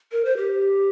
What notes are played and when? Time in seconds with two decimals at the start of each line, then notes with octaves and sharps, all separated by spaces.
0.12 A#4
0.25 C5
0.37 G4